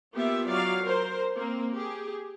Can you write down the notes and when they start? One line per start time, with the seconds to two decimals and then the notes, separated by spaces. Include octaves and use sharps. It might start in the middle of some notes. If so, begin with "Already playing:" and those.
0.14 A#3 B3 F4 G4 E5
0.47 F#3 D5 F5
0.83 A#4 C5
1.36 A#3 C4
1.73 G4 G#4